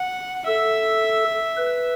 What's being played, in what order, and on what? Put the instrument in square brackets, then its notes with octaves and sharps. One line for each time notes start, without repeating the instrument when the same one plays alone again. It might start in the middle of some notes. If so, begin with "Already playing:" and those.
Already playing: [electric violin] F#5
[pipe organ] A4 [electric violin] E5
[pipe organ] B4